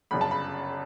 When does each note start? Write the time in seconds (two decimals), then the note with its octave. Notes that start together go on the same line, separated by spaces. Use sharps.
0.11 G1 F#2 C#3 B5
0.21 A5
0.31 B5